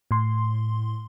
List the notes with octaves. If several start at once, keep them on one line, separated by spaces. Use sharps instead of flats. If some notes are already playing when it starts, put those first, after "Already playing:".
A2 C6